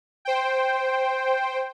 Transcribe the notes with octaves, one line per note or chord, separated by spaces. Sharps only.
C5 G5